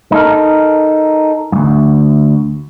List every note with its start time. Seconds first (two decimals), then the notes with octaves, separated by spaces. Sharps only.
0.12 D#4 A4 A#4
1.52 D2 G2